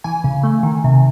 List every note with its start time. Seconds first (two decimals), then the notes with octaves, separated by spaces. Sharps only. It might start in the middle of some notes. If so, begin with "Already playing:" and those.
0.04 E3 G#5
0.24 C#3
0.44 A3
0.63 D#3
0.84 C3